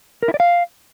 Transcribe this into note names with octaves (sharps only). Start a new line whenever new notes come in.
A#4
E4
D5
F5